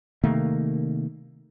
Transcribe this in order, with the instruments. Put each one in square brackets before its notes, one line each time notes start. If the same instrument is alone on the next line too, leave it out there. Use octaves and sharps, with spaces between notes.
[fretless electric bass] C3 D#3 A3 A#3